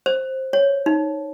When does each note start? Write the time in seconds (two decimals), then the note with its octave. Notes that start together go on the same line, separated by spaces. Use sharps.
0.06 C5
0.53 C#5
0.86 D#4